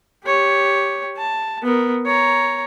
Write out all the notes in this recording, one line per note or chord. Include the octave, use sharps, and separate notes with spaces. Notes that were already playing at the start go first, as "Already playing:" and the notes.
G4 C#5
A5
B3 A#4
C#5 A#5